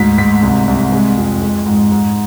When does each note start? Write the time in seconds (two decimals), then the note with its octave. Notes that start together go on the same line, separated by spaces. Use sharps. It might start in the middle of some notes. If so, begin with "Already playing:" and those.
Already playing: D2 G#2 B6
0.18 G#2 B6
0.43 C2
0.67 C2
0.93 G#3
1.17 F2
1.42 G#3
1.66 G#2
1.92 G#2